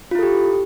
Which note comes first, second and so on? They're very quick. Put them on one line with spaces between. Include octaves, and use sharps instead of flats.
F4 E4 A4 G4